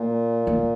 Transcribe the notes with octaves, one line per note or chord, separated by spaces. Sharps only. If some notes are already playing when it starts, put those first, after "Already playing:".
Already playing: A#2 A#3
A#3